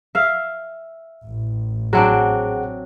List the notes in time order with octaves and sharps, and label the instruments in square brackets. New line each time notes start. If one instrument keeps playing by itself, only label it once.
[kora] E5 F5
[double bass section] A1
[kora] F#3 C4 D4 [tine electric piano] G#4 F#5